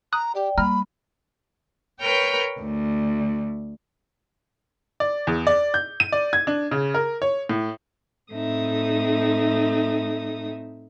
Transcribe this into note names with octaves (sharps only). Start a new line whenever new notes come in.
A#5 D#6 F#6
G4 D5 G5
G3 A#3 A#5 B5 F6
A#4 B4 C#5 G5 F6 G6
D2
D5
E2
D5
G6
D#7
D5
G#6
D4
C#3
A#4
C#5
A2
A2 C4 D#4 A4 E5 D#6